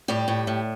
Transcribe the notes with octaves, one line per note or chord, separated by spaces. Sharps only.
A2 G3 G4
A2
A2